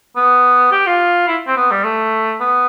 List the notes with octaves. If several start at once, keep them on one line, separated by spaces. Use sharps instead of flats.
B3
G4
F4
E4
C4
B3
G3
A3
B3